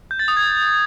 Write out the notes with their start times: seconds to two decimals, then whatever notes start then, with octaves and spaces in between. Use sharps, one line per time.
0.11 G6
0.19 A6
0.28 D#6
0.37 G#6